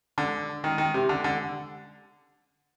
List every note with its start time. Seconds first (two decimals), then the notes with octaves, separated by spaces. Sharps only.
0.18 D3
0.64 D#3
0.78 D#3
0.94 C3
1.09 D3
1.24 D3